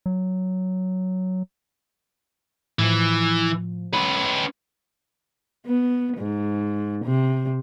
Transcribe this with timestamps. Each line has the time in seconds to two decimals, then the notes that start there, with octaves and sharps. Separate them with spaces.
0.06 F#3
2.79 A2 E3 F3
3.93 C#4 B4 B5
5.66 B3
6.18 G#2
7.05 C3